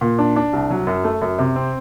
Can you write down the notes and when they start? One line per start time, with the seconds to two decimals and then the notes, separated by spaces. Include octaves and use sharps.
0.01 A#2
0.18 D4
0.36 D4
0.53 C2
0.70 F#3
0.87 F#2
1.04 A3
1.21 F#2
1.38 C3
1.56 C4